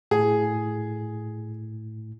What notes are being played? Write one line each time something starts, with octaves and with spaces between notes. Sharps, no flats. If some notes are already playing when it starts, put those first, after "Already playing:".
A2 G#4